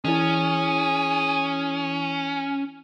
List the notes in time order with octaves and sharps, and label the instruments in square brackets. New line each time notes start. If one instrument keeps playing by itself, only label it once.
[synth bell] E3 E4 [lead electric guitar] C#4 [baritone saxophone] G#4